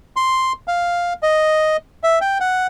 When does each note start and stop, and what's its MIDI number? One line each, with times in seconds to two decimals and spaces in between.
0.16 0.53 84
0.68 1.13 77
1.23 1.77 75
2.03 2.19 76
2.21 2.38 79
2.40 2.67 78